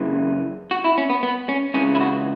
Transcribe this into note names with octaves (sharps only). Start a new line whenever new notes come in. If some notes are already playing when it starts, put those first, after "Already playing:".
Already playing: F#2 C#3 E3
F#4
E4
C#4
B3
B3
C#4
C#2 C#3 E3 C#4
E4
F#4